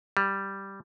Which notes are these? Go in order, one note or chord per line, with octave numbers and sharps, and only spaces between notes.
G3